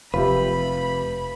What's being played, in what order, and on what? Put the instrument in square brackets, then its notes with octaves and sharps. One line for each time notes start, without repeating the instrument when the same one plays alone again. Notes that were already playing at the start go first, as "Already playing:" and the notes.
[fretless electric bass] F1 [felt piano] F4 G4 E5 [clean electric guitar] B4 [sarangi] B5